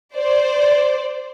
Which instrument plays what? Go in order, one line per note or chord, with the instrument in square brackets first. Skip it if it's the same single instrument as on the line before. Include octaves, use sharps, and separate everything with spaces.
[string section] C5 D5